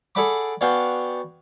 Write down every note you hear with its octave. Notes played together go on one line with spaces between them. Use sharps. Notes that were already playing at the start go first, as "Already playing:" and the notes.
G#4 A4 D5 F#5 B5 D6
B3 D4 F#4 F5 G5 G#5